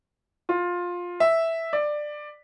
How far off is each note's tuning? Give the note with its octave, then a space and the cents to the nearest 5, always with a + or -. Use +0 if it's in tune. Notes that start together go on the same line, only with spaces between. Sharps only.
F4 +15
E5 -5
D5 +15